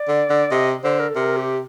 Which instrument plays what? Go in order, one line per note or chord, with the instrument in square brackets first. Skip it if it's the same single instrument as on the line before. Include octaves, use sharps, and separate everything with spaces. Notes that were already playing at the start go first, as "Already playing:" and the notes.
Already playing: [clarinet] D5
[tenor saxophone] D3
D3
[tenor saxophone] C3 [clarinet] D#5
[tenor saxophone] D3 [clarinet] C5
[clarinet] A#4
A4
[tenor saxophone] C3 [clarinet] A#4
[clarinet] G4